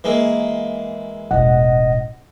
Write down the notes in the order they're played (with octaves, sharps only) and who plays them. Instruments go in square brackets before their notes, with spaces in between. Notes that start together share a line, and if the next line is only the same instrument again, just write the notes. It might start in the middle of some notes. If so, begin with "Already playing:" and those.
[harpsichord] E3 G#3 A#3
[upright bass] E1 A1 [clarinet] D#5 [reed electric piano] F#5